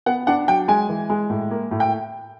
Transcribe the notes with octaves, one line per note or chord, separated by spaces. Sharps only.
B3 F#5
D4 F#5
F#3 G5
G#3 G#5
E3
G#3
A2
A#3
A2
G5